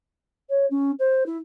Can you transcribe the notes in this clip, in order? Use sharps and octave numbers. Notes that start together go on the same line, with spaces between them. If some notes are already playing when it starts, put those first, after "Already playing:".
C#5
C#4
C5
E4